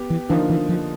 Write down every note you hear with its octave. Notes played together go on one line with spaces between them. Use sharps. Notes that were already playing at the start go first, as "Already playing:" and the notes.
Already playing: B3 G4
E3
D3 E3 F3 A#3 D#4
E3
F3